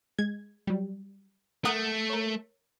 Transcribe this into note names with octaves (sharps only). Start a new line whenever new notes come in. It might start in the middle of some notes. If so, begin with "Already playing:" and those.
G#3 G#6
F#3 G3
A3 A#4 F#5 D#6
A#4 C#5